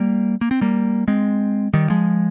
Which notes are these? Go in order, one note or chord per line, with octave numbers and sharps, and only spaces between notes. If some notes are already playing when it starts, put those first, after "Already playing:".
Already playing: G3 A#3
A#3
C4
G3 A#3
G#3 C4
D#3 G3
F3 G#3